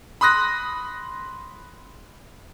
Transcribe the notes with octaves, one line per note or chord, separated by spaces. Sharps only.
B5 C6 D#6 F#6 A#6